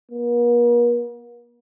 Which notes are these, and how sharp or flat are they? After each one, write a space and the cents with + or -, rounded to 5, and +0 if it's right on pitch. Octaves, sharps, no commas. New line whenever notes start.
A#3 +45